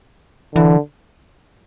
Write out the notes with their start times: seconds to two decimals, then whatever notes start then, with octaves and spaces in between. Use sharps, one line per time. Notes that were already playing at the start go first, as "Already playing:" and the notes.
0.55 D3 E3